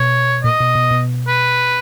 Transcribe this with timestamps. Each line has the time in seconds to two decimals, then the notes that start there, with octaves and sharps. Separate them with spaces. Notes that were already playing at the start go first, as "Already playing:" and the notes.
Already playing: B2 C#5
0.44 A#2 D#5
0.60 B2
0.75 B2
0.91 B2
1.27 B4